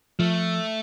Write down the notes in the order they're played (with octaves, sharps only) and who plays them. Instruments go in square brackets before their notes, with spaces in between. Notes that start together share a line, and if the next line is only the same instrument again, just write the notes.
[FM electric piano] F3 [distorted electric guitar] A3